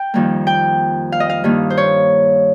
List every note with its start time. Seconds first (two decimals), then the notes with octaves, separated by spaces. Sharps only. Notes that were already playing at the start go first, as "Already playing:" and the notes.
Already playing: G5
0.14 F2 D#3 G3 A#3
0.47 G5
1.12 F5
1.20 D#5
1.29 F5
1.44 G2 D#3 A#3
1.70 C5
1.77 C#5